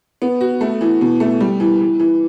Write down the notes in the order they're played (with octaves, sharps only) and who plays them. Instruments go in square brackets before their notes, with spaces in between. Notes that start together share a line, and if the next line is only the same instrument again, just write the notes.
[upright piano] B3
F#4
A3
E3
B2
A3
G3
E3
E3
E3